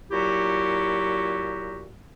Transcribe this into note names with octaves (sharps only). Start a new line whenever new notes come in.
A#2 F#3 E4 F#4 G4